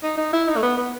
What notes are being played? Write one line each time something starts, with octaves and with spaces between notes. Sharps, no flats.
D#4
D#4
E4
D#4
A3
B3
B3